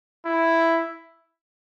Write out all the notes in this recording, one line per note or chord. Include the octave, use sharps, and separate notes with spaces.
E4